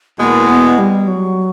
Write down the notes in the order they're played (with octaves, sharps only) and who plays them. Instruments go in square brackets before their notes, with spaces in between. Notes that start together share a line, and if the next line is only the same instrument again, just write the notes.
[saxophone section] E2 B2 G#3 [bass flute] A#3
[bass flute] B3
G3
F#3